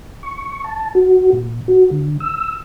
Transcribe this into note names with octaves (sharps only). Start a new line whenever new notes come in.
C#6
A5
F#4
A#2
F#4
D3
E6